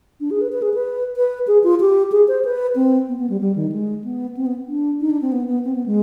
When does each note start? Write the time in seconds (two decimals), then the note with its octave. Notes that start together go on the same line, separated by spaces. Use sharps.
0.21 D4
0.31 G#4
0.41 B4
0.52 B4
0.62 G#4
0.74 B4
1.17 B4
1.48 G#4
1.64 F4
1.81 G4
2.12 G#4
2.28 C5
2.45 B4
2.76 C4
3.08 B3
3.19 B3
3.30 G3
3.41 G3
3.56 D#3
3.72 G#3
4.04 B3
4.37 C4
4.46 B3
4.68 D4
5.01 D#4
5.10 D4
5.21 C4
5.32 B3
5.48 B3
5.65 C4
5.76 B3
5.86 G#3